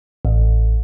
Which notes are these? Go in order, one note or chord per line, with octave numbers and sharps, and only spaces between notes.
A1